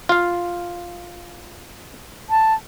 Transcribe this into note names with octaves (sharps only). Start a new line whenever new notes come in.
F4 F5
A5